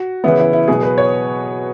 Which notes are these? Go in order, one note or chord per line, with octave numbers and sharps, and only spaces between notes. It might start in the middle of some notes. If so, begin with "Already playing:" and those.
Already playing: F#4
C#3 E3 B3 E4
E4
E4
B2 F#3 B3 G#4
B4
C#5